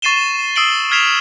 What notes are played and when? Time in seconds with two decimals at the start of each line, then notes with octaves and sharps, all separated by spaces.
0.02 C#6 A6 C7 D#7 E7 G7
0.56 D#6 E6 C7 D7 F#7 G7
0.91 F6 G#6 B6 C7 E7 F7